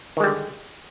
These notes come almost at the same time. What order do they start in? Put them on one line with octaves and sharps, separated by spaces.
D#3 G#3 G3 D3